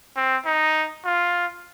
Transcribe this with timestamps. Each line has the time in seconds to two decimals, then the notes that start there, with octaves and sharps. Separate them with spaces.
0.17 C4
0.46 D#4
1.05 F4